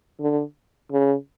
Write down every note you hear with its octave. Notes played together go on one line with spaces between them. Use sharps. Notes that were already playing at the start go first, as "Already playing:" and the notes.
D3
C#3